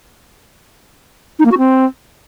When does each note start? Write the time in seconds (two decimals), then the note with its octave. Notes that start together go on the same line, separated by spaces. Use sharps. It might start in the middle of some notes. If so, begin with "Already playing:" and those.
1.39 D#4
1.45 A#3
1.52 F#4
1.58 C4